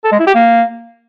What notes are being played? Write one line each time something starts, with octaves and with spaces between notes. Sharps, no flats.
A4
G#3
E4
G4
A#3